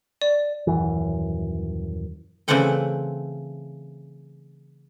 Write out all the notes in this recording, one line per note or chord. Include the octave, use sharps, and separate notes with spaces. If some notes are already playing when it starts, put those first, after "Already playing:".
D5
D#1 F#2 E3
C#3 E3 A3 C4 F#5 G5